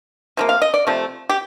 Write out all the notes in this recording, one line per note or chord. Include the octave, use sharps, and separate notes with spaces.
C3 F3 A#3
F5
D#5
D5
C3 F3 A3
G4